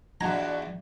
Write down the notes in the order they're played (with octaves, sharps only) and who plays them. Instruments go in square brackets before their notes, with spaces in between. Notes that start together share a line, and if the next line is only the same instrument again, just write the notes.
[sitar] E2 A#2 G4 [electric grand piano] D4 F#4 [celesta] D#5 G#6 [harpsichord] A#5